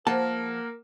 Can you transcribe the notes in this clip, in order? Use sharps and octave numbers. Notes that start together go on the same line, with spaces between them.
F3 A#3 G#4 A#4 C5 F#5 A5